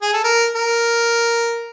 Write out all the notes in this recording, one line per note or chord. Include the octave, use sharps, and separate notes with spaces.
G#4
A4
A#4
A#4